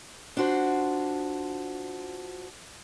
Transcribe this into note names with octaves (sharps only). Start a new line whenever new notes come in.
D4 F4 F#4 C5